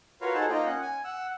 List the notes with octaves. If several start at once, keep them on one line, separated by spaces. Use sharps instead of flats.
F4 F#4 A#4 B4 C#5 F5
D#4 F#4 G#4 A4 C5 A5
A#3 D#4 F4 D#5 G5
C#4 F#5
G#5
F#5 E6